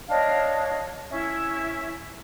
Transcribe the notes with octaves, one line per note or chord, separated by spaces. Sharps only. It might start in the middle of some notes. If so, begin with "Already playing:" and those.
D4 C#5 D#5 F5
C#4 E4 E5